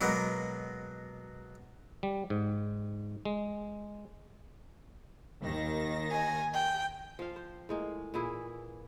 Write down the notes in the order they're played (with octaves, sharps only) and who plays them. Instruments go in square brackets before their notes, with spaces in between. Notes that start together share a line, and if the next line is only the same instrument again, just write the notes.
[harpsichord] B2 F#3 G#3 A#3 B3
[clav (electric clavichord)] G3
G#2
G#3
[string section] D#2 D#3 A#6
[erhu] G#5
G5
[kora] F3 F5
C5
A2 G#3 A#3
A#2 E3 E4 G#4